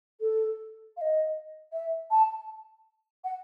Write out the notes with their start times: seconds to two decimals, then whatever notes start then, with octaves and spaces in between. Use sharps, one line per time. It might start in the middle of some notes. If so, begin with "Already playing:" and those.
0.21 A4
0.97 F5
1.01 D#5
1.73 E5
2.11 A5
3.24 F#5